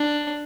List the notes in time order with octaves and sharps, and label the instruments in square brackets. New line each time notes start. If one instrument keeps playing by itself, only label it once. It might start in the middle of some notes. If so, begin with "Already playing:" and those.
Already playing: [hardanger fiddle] D4